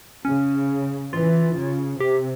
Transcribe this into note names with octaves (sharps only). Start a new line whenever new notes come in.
C#3 C#4
E3 F4
C#3
C3 G4